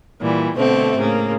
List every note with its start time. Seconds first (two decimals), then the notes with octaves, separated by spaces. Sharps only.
0.21 A#2 E3 G3
0.56 B2 D3 A3 C4
0.96 A2 C#3 A#3